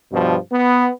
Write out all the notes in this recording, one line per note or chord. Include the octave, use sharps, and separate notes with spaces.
G2 B2 F3
B3